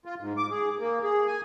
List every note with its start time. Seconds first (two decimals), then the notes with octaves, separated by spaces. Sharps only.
0.05 F4
0.21 G#2
0.37 D6
0.51 G#4
0.79 A#3
1.03 G#4
1.27 G#5